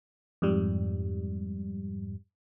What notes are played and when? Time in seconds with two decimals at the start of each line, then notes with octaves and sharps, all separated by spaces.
0.42 F2 G#2 G3